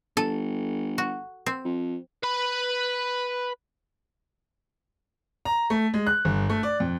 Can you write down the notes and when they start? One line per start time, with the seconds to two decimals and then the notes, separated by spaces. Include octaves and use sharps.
0.17 G1 A4
0.98 F#4
1.46 C4
1.65 F2
2.23 B4 B5
5.45 A#5
5.70 A3
5.94 G#3
6.07 F#6
6.25 G1
6.50 A3
6.63 D5
6.80 F2